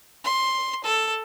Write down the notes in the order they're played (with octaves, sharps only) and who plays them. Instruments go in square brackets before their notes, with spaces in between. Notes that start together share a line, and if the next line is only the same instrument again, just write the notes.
[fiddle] C6
A4